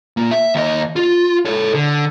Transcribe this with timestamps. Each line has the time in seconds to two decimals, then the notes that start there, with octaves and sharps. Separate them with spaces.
0.17 A#3 F4
0.31 E5
0.55 D#2 D#5
0.96 F4
1.45 A4 C#5
1.74 D3